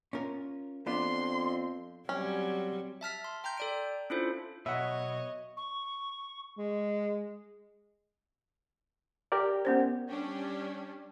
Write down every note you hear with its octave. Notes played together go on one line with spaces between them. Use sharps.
C#4 F4 A#4
F2 B3 D4 F4 C6
F#3 G3 C4 C#4
E5 A5 F6 B6
C6
G5 A#5 C6 G6
A4 D5 D7
C#4 D4 E4 F4 A4 C5
B2 F#3 C#5 D#5 E5 F#5
C#6
G#3
G4 A#4 D5
B3 C#4 C5
G3 C#4 D4 G4